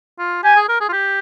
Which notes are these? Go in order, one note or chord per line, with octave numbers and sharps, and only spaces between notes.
F4
G4 G#5
G#4
A#4
G#4
F4
G4